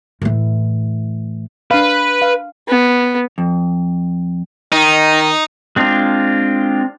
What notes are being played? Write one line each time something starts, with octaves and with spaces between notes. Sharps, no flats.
A2 E3
D4 B4 F5
F5
B3
F2
D#3 D#4
G#3 C4 D4 F4